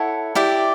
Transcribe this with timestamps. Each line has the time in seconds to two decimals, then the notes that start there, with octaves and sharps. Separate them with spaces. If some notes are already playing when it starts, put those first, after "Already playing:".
Already playing: E4 A4 C#5 F#5
0.35 E4 G4 D5